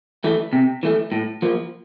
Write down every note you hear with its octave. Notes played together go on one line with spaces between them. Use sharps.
E3 A3
C3
E3 A3
A2
F3 A#3